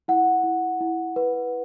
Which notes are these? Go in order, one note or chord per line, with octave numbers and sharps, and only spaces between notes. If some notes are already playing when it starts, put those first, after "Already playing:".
E4 F#5
E4
E4
B4